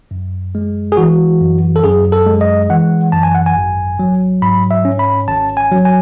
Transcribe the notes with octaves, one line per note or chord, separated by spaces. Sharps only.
F#2
G#3
G#4
E3 F#4
F#2
A4
F#2 G#4
A4
G#3
D#5
E3 F#5
F#2 A5
G#5
F#5
G#5
G#1
F#3
G#2 B5
E5
C#4
B5
G#1 A5
G#5
F#3
G#5